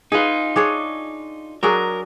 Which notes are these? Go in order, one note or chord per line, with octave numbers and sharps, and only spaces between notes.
D#4 F4 G#4 B4
D4 G#4 C#5
F#3 D4 G#4 A#4